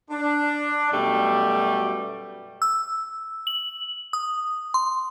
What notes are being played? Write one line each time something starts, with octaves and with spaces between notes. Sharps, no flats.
D4
F#2 B2 G3 A3 D5
E6
F#7
D#6
C6